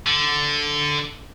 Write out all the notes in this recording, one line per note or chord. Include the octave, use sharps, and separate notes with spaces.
D3